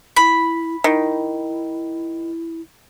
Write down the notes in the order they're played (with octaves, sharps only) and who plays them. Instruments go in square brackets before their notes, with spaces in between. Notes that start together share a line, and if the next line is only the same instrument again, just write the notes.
[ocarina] E4 [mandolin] B5
[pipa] D#3 [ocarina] E4